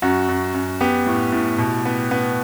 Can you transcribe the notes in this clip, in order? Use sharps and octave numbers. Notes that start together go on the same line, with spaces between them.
F#2 F#4
F#2
F#2
B3 G4
A2
A2
B2
B3
B3